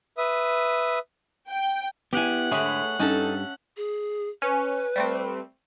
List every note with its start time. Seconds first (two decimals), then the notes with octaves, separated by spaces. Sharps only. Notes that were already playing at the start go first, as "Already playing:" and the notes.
0.18 B4 E5 D#6
1.49 G5
2.13 B3 E4 G4 F#5 G#5
2.51 G#2 D3 A3 G#4 B4 C#5 E5
3.00 G2 C#4 D#4 A4 E5 A5
3.77 G#4
4.42 C#4 B4
4.96 G3 A3 C4